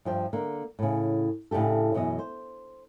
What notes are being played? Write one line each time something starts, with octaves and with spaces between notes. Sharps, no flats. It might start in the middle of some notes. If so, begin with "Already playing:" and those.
G2 F3 G5
D3 A#3
A2 C#3
A2 C#3 D4 G4 A4
F#2 B2 E3 D#5
C5